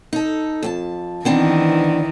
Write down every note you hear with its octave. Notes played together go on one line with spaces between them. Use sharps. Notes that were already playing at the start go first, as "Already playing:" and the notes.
D#4 A4
F2 F#4 A5
D#3 E3 B3 C4 D4